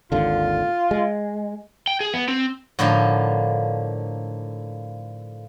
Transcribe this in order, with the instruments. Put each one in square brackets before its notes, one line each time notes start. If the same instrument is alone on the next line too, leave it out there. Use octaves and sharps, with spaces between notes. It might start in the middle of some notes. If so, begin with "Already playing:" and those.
[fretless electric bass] G#1 D#2 D3 [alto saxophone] F4
[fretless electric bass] G#3
[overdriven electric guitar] G5
G#4
B3
C4
[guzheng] A2 D3 F3 A#3 D4 D#4